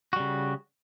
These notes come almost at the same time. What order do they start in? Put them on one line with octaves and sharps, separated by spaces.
F#4 G3 C#3